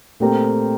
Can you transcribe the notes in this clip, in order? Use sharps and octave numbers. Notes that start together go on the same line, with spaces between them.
A#2 A3 C4 G4 A#4